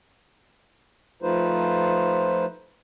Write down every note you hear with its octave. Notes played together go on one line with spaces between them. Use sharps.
F3 A3 D#4 F4 B4 C5